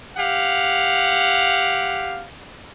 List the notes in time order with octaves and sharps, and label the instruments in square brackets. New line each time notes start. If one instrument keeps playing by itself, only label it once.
[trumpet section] G4 F5 F#5